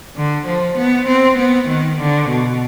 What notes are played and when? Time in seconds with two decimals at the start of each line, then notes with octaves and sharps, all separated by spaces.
0.16 D3
0.46 F3
0.77 B3
1.08 C4
1.38 B3
1.69 D#3
2.00 D3
2.30 B2